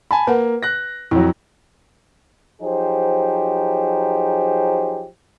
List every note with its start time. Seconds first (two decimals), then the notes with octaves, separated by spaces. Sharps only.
0.11 G#5 A5 B5
0.27 A#3 B4 F#5
0.63 F#6 A#6
1.11 F2 F#3 E4
2.62 F3 F#3 D#4 G4 G#4 C5